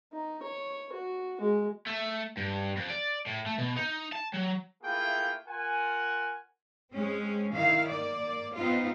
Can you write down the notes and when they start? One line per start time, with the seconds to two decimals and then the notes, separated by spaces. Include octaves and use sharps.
0.13 D#4
0.43 C#5
0.93 F#4
1.41 G#3
1.87 A3
2.37 G2
2.77 F2
2.90 D5
3.26 A2
3.46 A3
3.58 B2
3.77 D#4
4.12 A5
4.33 F#3
4.83 A3 A#3 E4 F4 G#4 G5
5.47 F4 A#4 F#5 G#5
6.93 G#3 C4 C#4
7.52 D#3 E4 F5
7.89 A#3 D5
8.55 B3 C4 D#4 F4